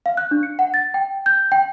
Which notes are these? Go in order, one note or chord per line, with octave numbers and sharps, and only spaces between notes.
F5
F#6
D4
C#7
F#5
A6
G5
G6
G5